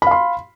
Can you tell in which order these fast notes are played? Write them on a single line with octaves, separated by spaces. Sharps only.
B5 F5 C6